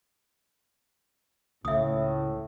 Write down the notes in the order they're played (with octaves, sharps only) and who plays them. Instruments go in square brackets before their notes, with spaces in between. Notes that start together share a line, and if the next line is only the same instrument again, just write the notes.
[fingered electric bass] C#2 [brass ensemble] A2 [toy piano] E5 D#6